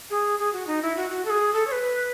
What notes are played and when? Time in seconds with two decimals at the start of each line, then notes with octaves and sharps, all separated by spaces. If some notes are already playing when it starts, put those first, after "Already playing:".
0.10 G#4
0.39 G#4
0.53 F#4
0.67 D#4
0.82 E4
0.97 F#4
1.10 F#4
1.25 A4
1.30 G#4
1.53 A4
1.67 C#5
1.72 B4